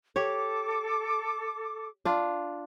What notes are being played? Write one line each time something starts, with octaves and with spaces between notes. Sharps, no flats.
G4 A4 C#5 D6
D4 F4